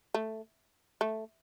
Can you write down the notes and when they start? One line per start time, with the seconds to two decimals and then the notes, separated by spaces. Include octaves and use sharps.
0.14 A3
1.01 A3